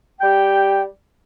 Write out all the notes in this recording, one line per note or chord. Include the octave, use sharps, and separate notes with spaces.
G3 G4 G5